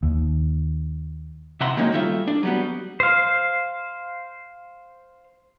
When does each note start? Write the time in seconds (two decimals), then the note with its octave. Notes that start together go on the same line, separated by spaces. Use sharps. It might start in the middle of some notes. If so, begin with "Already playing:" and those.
0.03 D#2
1.61 C3 E5 F#5 A#5 C6
1.77 D#3 F#3 G#3 A#3 C#4 D#4
1.92 G3 A3 F4 E5
2.28 D4
2.43 F#3 G3 B3
3.00 C5 F5